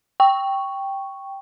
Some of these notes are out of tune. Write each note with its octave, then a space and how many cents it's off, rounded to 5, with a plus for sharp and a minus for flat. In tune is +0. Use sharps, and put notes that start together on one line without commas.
G5 +0 C#6 +0